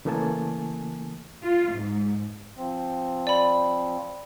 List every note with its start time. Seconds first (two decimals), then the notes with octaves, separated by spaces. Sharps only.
0.05 C#3 E3 A3 A#3 G#5 A5
1.43 F4
1.73 G#2
2.58 F3 C4
3.27 D5 B5